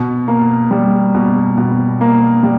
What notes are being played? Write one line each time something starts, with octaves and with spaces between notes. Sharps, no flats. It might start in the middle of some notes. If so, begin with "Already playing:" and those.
Already playing: B2
A#3
G3
B2
B2
A#3
G3